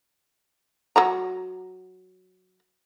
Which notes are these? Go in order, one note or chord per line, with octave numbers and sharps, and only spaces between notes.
F#3 F#4 A#5